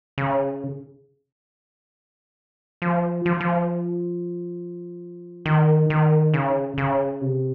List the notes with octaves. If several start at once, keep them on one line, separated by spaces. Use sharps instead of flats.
C#3
F3
F3
F3
D#3
D#3
C#3
C#3
C3